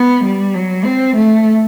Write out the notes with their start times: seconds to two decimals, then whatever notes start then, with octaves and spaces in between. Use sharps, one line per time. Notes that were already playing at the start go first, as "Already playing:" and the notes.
Already playing: B3
0.24 G3
0.54 F#3
0.85 C4
1.15 A3